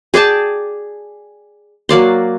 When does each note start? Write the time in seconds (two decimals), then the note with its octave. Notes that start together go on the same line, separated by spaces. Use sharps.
0.14 G#4 D5 G5 A5
1.89 F#3 A#3 D5 C6